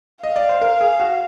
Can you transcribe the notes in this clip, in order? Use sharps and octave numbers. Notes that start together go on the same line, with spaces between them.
D#5 F5
D5
C5
A#4
G#4
F#4